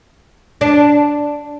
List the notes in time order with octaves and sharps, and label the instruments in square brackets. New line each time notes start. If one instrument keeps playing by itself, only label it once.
[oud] D4